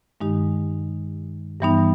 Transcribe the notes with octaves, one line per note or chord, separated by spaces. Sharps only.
G2 D#3 G#3 D#4 G4
G2 E3 G3 B3 D#4